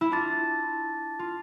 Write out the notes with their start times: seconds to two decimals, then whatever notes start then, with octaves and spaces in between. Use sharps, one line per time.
0.01 E4
0.11 D4 F4 A5 D6 A6
1.19 F4